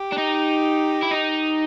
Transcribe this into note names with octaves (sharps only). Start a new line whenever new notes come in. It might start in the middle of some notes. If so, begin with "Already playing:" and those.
Already playing: G4
D4
D#4
E4
D#4